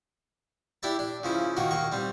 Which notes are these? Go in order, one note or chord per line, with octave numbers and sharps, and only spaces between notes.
D4 E4 G4 E5 A5
D4
C#3 F3 E4
D#3 A#3 F#4
D#2 A#3 C#6
G3 C4